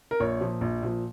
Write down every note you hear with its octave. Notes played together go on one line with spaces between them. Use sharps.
A#4
A#1 C#5
A#2 F3
A#1
A#2 F3